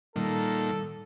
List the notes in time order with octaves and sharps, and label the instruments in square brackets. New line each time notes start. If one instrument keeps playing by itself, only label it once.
[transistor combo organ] A#2 D#3 [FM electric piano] G3 [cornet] A4